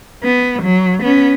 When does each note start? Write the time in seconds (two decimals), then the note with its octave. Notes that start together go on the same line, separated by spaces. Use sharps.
0.23 B3
0.63 F#3
1.03 B3 C#4